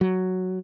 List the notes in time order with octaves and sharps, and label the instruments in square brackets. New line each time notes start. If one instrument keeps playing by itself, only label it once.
[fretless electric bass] F#3